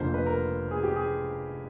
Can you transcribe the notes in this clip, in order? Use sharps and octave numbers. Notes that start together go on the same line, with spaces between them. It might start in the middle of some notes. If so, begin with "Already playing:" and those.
Already playing: F1 F2 D3 F3 A#3 C5
B4
A#4
G#4
G4
G#4